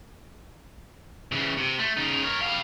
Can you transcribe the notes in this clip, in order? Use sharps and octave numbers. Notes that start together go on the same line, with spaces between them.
C#3 E3
C3
A3
C#3 D#4
A#4 C#5
G3 F5